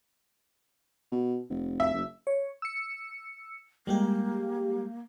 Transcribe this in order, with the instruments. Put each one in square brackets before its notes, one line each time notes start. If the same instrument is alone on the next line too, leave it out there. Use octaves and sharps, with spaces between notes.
[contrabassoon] B2
F1
[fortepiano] E5
[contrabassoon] F#1
[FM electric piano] C#5
E6 C#7
[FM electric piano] G3 G#3 G4 [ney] A#3